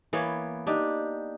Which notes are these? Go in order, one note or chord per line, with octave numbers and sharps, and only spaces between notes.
E3 A#3 B3 C#5
D4 D#4 G4